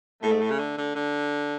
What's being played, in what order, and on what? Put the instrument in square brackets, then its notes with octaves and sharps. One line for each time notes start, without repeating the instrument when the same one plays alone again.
[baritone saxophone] A2 [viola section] A3
[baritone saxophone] G#2
A2
C#3
D3
D3
D3